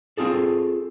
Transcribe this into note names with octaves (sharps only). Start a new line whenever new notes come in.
C4 F4 G#4 A4